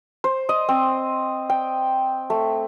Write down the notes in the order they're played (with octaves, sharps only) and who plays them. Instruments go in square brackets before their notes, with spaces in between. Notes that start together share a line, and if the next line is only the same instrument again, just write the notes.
[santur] C5
D#5
C4
G5
A3